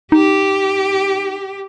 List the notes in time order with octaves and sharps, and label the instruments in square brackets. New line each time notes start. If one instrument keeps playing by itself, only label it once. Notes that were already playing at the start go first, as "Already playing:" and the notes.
[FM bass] D#4 [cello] G4